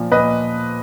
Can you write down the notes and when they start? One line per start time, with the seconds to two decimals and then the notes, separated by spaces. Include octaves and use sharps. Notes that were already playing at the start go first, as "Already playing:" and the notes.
Already playing: A#2 F3
0.12 A#2 B4 D#5